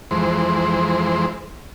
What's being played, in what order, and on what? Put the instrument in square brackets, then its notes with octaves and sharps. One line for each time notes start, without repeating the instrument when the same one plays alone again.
[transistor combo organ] F2 E3 G#3 C5